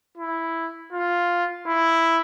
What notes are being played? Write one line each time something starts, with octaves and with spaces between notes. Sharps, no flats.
E4
F4
E4